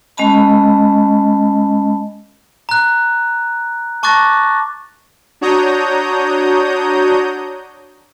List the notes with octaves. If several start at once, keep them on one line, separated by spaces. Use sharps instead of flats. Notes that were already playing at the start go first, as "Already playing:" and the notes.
G#3 C#4 D#5 A5 B5
A#5 F#6
A5 C#6 D6 F#6 A6 A#6
D4 F#4 C#5 A#5 D#6 G6